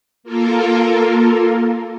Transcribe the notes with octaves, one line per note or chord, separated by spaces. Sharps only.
A#3 F4 A4 A#4